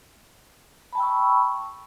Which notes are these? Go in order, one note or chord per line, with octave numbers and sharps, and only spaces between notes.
G5 A5 B5 C#6 E6